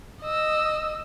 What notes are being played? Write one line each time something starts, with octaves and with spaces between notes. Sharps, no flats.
D#5 E6